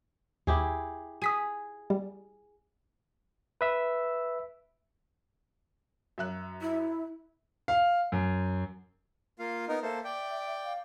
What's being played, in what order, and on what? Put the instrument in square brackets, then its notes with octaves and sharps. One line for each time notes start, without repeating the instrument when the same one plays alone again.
[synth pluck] D#2 [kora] E4 G4 G#4
[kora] G#4 [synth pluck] D#6 B6 D#7
[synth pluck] G3
[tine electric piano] B4 E5 E6
[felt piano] F#2 E5 F#6
[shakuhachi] E4
[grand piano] F5
F#2
[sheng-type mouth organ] A#3 F4 F5
[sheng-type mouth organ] B3 D#4 A#4 [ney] D#5
[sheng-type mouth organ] A#3 A4 C5 [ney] E5
[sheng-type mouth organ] D5 G5
[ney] F5